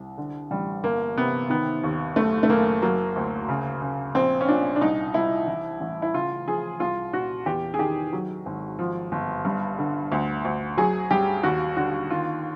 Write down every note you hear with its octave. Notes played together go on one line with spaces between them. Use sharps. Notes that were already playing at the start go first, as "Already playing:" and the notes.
Already playing: C2
D3
A1 G3
G1 A#3
C3 B3
D#3 B3
D#2
F#1 A3
A3
F#1 A#3
F#3 A#3
D2
C#3
C#3
A#1 C4
C#4
A#2 D4
D4
C2 D#4
C2 E4
E3
A1
E4
C#3 F4
F3 G#4
C2 F4
A#2 F#4
E2 G4
G#4
D#3 G4
F#3
G#1
F3
G1
G2
D3
D2
D2
F#3 G#4
G2 G4
D#2 F#4
D3 F#4
D#3 F4